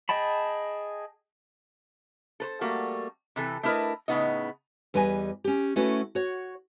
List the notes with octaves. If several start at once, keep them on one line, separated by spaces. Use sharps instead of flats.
G#4 D#5 G5 A5 B5
A4 B4 C5
G3 A3 A#3 F#4
C3 E3 A4
A3 D4 E4 A#4 B4 D#5
A2 C#3 G#3 B3 D#4 D#5
E2 G3 B4 D#5 G#5
C#4 G4
A3 C#4 E4 F#4 B4
F#4 C#5